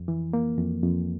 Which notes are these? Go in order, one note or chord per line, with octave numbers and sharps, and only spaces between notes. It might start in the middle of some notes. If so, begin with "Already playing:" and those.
Already playing: F2
E3
A#3
F2
F2